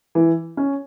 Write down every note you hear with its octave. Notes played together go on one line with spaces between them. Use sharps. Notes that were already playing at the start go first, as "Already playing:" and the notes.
E3
C#4